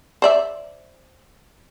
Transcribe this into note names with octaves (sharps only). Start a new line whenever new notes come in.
C5 D5 E5